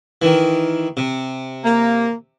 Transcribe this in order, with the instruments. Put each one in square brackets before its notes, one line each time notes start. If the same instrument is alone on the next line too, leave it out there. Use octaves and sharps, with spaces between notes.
[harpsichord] D#3 E3
C3
[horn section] A#3